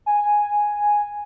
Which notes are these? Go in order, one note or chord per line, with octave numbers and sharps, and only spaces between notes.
G#5